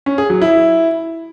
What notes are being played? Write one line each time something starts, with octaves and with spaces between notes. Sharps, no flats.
C#4
G#4
F#3
E4